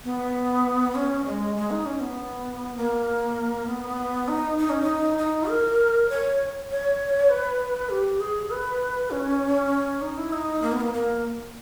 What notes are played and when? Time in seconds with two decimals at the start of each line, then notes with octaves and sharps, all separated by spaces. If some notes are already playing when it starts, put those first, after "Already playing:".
0.04 B3
0.95 C#4
1.25 G#3
1.56 G#3
1.71 D#4
1.86 C#4
2.00 B3
2.77 A#3
3.67 B3
4.28 D#4
4.58 D#4
4.70 C#4
4.82 D#4
5.18 D#4
5.49 A#4
6.09 C#5
6.70 C#5
7.30 B4
7.90 G4
8.20 G#4
8.51 B4
9.11 C#4
10.01 D#4
10.18 E4
10.33 D#4
10.62 A#3
10.72 B3
10.81 A#3
10.93 A#3